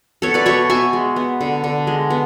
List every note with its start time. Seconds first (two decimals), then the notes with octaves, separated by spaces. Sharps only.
0.22 B3 A4 C#5
0.34 B4 D5
0.46 B2 C#5 E5
0.70 B2 E5 G#5
0.93 G#3
1.16 B3
1.41 D3
1.64 D3
1.87 G#3
2.10 B3